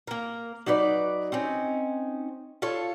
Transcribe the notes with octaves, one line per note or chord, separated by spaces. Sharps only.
A#3 A#4
F#3 D#4 B4 D5
C4 C#4 D#4
F4 A4 C#5